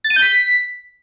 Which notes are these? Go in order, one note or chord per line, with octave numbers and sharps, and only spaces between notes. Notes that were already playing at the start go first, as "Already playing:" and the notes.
A6
D#7
G6
B6